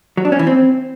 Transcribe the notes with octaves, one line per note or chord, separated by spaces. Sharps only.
F#3
D4
C#4
E3
C4